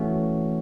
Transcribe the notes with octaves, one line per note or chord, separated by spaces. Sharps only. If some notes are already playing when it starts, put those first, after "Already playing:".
Already playing: E3 A3 C#4 F#4